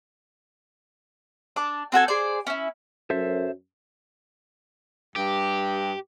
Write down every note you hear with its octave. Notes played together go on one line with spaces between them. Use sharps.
D4 A5 D6
C4 F#4 A4 G#5
G#4 C5 D5
C#4 E4
F#2 A4 C5 E5
G2 G4